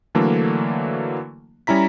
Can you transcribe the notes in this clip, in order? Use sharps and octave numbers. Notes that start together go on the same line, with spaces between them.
D3 E3 F#3 A3 A#3 D4
G3 C#4 E4 A#5 B6